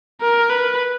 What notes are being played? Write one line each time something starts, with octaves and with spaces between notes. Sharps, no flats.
A#4
B4